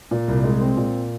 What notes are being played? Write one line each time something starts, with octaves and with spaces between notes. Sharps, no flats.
A#2
C2
G#3
C4
A#2